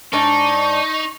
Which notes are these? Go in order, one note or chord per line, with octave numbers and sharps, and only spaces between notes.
G#2 D4 D#4 D5 C#6